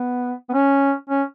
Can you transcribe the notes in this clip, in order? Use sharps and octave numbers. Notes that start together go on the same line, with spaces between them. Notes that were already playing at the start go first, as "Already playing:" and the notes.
Already playing: B3
B3
C#4
C#4